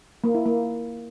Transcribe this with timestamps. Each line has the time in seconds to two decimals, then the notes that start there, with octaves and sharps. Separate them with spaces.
0.24 A#3
0.35 E4
0.46 A#3